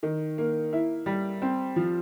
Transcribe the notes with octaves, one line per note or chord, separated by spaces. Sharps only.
D#3
A#3
E4
G3
C4
F3